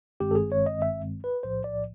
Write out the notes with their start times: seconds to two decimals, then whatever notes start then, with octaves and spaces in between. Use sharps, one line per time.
0.20 G1 G2 D#3 G#3 C4 G4
0.31 A4
0.35 G#4
0.52 C#5
0.66 D#5
0.82 E5
1.24 B4
1.43 B1 A2 F3 C5
1.64 D5